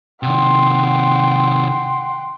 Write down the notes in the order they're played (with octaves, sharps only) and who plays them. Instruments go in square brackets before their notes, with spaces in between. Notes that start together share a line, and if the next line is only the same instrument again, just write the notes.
[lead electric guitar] C3 D#3 [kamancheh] F#5 G5 [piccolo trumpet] C6